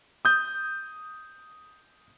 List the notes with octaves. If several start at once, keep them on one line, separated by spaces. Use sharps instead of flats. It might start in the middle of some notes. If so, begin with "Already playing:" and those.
D#6 G6